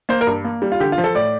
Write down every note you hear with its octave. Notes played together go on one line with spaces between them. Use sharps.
A#3 C5
A#4
G2
A#3
G3
F4
D3 G4
F4
F3
A4
A2 D5